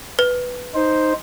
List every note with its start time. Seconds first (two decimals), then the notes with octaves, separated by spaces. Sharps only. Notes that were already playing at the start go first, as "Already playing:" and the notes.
0.19 B4
0.75 D#4 C5